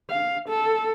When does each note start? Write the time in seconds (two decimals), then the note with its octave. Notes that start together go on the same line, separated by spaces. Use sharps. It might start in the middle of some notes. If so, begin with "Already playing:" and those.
0.10 F5
0.49 A4